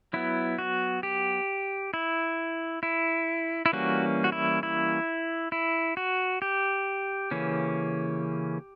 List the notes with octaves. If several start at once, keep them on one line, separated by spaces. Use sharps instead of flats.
F#3 B3 E4
F#4
G4
E4
E4
E4
E3 G3 A#3 C#4 F#4
F#4
E4
E4
E4
F#4
G4
C#3 E3 A#3 C#4